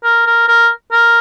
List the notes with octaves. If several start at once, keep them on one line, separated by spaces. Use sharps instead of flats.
A#4
A#4
A#4
A#4